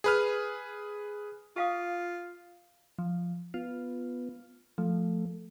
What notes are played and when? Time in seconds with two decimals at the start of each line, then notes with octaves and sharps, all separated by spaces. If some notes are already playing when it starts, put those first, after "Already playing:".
0.04 G#4 B4 F6
1.56 F4 G4 F5 D#6
2.99 F3
3.54 B3 F4
4.78 F3 A3